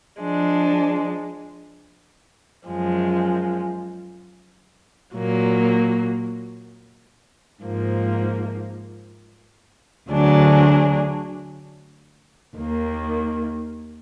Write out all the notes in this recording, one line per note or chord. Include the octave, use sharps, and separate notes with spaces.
F3 G#3 D4
F#2 F3 G#3
A#2 F#3 A#3
G#2 F3 A#3
D2 D3 F#3 D4 G#4
D#2 D#3 A#3